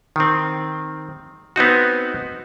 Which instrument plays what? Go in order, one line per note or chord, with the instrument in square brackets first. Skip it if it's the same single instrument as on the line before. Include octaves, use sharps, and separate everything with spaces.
[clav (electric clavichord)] D#3 C4
B3 C4 D#4 F#4